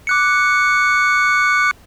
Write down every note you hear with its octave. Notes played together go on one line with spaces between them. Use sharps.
D6 F#6 C#7